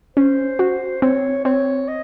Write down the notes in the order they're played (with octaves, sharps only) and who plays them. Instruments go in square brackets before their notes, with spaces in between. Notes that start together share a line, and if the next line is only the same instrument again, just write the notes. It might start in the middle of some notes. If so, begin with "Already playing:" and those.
[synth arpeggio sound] C#4 [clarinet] C5
[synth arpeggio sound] F#4
[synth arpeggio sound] C4 [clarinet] C#5
[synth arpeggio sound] C4 [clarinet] C#5
[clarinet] D#5